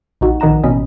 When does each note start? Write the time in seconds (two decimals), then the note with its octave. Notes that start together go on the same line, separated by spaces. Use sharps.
0.21 A#1 D#4 F#4
0.40 A#1 D#3 D#5 F#5 A#5 E7
0.64 A1 B2 C#4 D#5 B5